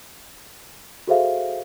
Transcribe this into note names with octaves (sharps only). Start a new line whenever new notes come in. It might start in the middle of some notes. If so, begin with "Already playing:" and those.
F#4 G#4 A4 C5 E5 F5